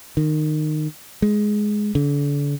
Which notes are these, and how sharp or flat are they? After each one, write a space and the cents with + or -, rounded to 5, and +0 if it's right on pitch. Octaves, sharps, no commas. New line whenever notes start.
D#3 -20
G#3 +10
D3 -40